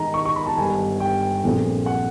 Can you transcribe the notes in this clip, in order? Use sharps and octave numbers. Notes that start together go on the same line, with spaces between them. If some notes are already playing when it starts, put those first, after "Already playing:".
Already playing: G#2 D#3 G#3 A#5
C#6
C#6
B5
A5
G1 G2 D#3 G#5
G5
A#1 A#2 F3 A3 C4
F#5